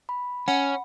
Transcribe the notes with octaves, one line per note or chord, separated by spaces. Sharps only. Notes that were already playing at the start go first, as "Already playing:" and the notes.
B5
C#4 F#5